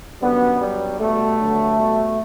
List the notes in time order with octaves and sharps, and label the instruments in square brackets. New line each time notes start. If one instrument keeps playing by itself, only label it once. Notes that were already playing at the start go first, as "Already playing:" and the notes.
[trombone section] F#2 D3 G3 B3
G2 F#3 G3
B2 G3 A3
G2 D3 F#3
B2 G3